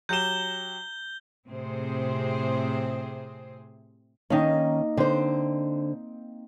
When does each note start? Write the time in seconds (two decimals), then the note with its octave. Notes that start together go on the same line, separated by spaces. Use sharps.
0.09 F#3 G4 G6 E7 G7
1.49 A2 C3 C4 G#4 C5
4.30 D#3 A#3 C#4 D#4
4.97 D3 C4 C5